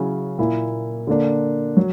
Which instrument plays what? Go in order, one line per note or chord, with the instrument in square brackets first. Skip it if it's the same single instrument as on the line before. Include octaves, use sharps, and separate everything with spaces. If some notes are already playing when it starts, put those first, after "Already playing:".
Already playing: [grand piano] C#3 F#3 C#4 E4
A#2 A#3 E4
D3 A#3 D4
F#3